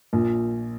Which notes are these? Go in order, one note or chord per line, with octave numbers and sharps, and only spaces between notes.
A#1 A#2